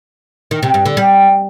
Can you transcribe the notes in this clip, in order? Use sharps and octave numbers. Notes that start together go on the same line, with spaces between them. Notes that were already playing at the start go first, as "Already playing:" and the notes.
D#3
C3
G2
D3
G3